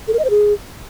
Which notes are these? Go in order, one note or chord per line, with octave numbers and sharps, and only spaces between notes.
A4
A#4
D#5
C5
G#4